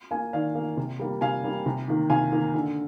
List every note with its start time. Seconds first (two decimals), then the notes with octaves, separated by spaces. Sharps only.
0.11 A#3 F5 G#5
0.33 D#3 D5 F5
0.55 A#3
0.77 C3
0.99 G3 A#3
1.21 C3 F5 G#5
1.44 G3 A#3
1.66 C3
1.88 D#3 A#3
2.10 C3 F5 G#5
2.32 D#3 A#3
2.54 D3